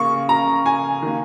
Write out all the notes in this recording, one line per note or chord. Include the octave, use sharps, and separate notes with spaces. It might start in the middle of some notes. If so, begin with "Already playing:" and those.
Already playing: C#3 A#3 C#6
A#5
G#5
D#3 A#3